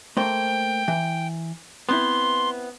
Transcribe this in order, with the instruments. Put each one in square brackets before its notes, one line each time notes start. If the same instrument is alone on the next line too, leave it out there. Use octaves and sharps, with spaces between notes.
[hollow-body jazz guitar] A3 A#3 C5 [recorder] G5
[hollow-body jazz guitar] E3
[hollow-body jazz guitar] B3 C4 E4 [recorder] C6